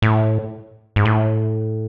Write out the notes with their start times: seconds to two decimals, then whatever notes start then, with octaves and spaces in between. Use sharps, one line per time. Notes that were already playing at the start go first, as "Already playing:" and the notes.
0.02 A2
0.96 G#2
1.05 A2